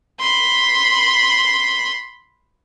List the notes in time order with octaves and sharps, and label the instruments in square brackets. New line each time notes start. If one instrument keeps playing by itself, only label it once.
[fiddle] B5 C6